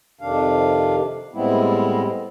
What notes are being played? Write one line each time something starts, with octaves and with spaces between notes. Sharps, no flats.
F2 C3 D#3 D4 F5
A2 G3 G#3 B3 C4 E4